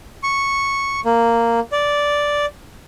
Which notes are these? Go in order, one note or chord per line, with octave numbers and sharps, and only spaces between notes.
C#6
A#3
D5